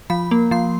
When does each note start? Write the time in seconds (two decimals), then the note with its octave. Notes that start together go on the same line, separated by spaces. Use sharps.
0.10 F3 B5
0.31 A#3
0.51 F3 C6